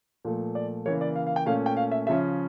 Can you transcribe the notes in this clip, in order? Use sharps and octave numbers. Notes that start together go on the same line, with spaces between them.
A#2 F3 A3
D5
C#3 E3 A#3 C#5
D5
F5
F5
G5
A#2 A3 C#4 F5
G5
F5
E5
C#3 F3 C#4 E5